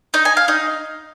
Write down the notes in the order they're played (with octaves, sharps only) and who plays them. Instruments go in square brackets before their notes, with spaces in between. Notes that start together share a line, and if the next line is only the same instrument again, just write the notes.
[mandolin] D#4
G#5
F5
D#4